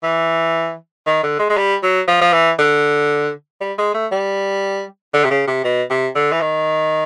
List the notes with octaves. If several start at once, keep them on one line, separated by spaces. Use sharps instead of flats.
E3
D#3
D3
G#3
G#3
G3
F#3
F3
F3
E3
D3
G3
G#3
A3
G3
D3
C3
C#3
C3
B2
C3
D3
E3
D#3